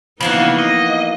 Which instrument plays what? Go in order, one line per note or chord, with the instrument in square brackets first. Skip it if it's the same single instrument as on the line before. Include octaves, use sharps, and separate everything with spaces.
[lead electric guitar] C#3 [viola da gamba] E3 B3 D#4 [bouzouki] F3 A#3 F#4
[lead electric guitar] D#5